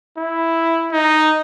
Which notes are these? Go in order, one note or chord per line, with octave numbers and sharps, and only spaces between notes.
E4
D#4